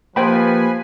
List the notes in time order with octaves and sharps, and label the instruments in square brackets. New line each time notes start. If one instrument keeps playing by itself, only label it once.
[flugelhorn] F3 [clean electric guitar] A#3 G4 [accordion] B4 G#5 [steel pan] C5 G5 B5